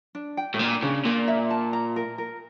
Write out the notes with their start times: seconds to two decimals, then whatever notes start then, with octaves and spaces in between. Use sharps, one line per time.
0.15 D4
0.37 G5
0.54 A2
0.59 A#2 D4
0.83 C#3 D4
1.05 A#2 A#4
1.28 E5
1.50 A5
1.73 A#5
1.96 A#4
2.18 A#4